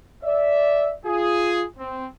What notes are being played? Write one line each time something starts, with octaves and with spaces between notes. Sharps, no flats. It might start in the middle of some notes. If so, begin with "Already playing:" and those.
D5 E5
F4 G#4
C4